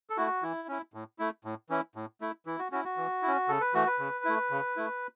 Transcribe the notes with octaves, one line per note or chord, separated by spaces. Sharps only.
A4
A3 E4 F#4
E3 E4
C#4 E4
A2
A3 E4
A2
E3 C#4 E4
A2
A3 E4
E3 E4
F#4
C#4 E4 F#4
F#4
E3
C#4 E4
C#3 A4
B4
E3 A3 F#4
B4
C#3
A3 E4
C#3
A3 E4